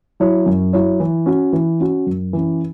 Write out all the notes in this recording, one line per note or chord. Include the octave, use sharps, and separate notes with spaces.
F#3 E4 C#5
F#2
F#3 E4 C#5
E3
C#4 F#4
E3
C#4 F#4
F#2
E3 C#4